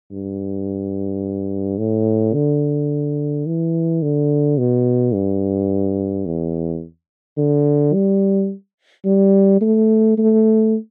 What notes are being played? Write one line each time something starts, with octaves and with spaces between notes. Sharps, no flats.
G2
A2
D3
E3
D3
B2
G2
E2
D3
G3
G3
A3
A3